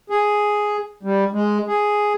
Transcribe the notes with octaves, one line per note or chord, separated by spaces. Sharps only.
G#4
G3
G#3
G#4